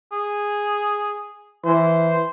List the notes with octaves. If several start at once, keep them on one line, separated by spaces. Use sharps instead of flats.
G#4
E3 C5